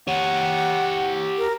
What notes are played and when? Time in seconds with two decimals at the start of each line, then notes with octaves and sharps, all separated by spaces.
0.07 G4 C#5 F#5
1.38 A#4